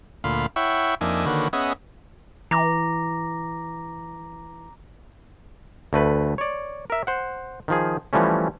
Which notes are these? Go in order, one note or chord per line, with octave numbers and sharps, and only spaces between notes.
D2 A#2 F4 F5 B5
E4 C#5 E5 F#5 G5 C#6
F2 A#3 D4 D#4 E5 G#5
D3 D#3 A#3 F#4 B4 C#5
B3 C#4 G#4 D#5 E5 F#5
E3 A#5 D6 A#6
D2 A3 B4
C#5 D5
A#4 E5
C5 F#5
D#3 F3 G#4
E3 F3 G3 A3 C#4